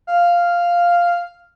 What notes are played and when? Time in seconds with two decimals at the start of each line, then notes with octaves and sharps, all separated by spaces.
0.07 F5